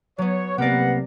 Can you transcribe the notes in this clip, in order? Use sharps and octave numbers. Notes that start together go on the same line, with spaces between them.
F#3 B3 C#5
C2 C3 A#3 B3 G4 D5 F#5